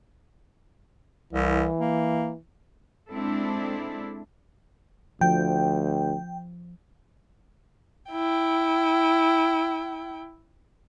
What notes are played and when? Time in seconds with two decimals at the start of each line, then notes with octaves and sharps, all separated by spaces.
1.33 C2 E3
1.80 A#3
3.11 G#3 C4 D4 E4 A4
5.21 D2 F3 G5
8.12 E4 G5